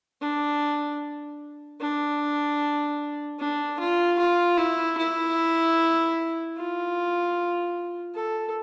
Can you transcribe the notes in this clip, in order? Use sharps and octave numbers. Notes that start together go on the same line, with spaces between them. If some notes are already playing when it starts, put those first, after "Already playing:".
D4
D4
D4
F4
F4
E4
E4
F4
A4